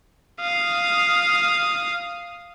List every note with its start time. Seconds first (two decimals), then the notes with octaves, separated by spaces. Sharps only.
0.41 F5 D#6